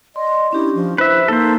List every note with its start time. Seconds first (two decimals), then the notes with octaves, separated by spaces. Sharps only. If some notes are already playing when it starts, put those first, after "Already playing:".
0.16 D5 D#5 C6
0.53 C#4 D4 E4 G4
0.75 F3
0.98 E4 B4 C5 E5
1.28 A#3 D#4 A4 C5